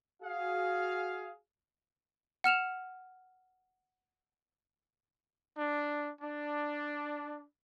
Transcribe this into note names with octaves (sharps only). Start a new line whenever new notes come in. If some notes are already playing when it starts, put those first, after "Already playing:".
F#4 G#4 F5
F#5 F6 E7 F7
D4
D4